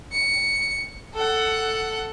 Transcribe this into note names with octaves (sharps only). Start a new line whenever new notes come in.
C#7
A4 F#5